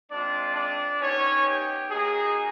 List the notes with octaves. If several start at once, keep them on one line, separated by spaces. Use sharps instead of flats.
G#3 C4 D4 F4 D5
D4 D5
B3 C#4 D#4 G4 C#5
G4
A#3 D#4 F#4 G#4